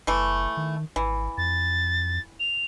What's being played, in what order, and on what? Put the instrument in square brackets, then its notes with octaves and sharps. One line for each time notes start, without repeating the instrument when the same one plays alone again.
[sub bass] F#1 [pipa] E3 A3
[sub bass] D#3
[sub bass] G#1 [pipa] E3
[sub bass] F2 [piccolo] A6
[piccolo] F7